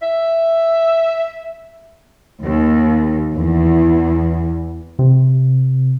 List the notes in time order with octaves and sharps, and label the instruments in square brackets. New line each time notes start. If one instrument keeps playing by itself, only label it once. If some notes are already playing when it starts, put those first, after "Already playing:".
[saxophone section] E5
[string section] D#2
E2
[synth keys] C3